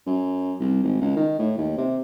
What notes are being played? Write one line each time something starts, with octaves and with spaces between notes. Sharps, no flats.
F#2
C2
G#1
C#2
D#3
A2
D#2
C3